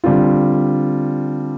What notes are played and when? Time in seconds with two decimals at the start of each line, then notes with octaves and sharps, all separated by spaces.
0.04 D3 G3 C4 F4